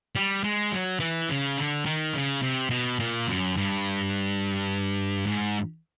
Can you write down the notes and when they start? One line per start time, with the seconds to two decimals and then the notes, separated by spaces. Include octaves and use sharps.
0.16 G3
0.44 G#3
0.72 F#3
1.00 E3
1.29 C#3
1.58 D3
1.85 D#3
2.14 C#3
2.42 C3
2.70 B2
3.00 A#2
3.28 F#2
3.57 G2
5.26 G#2